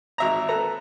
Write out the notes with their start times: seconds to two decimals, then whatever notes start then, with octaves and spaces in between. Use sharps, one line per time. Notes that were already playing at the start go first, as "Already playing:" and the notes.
0.18 G#1 E5 A#5
0.48 A4 B4 A#5